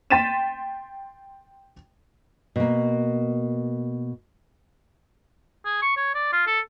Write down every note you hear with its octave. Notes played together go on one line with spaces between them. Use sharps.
G5 C6 A6 B6 D#7 E7
B2 A#3
G#4
C#6
C#5
D5
F4
A4